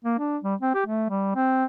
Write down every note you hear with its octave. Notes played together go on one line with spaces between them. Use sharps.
A#3
D4
G3
C4
G4
A3
G3
C4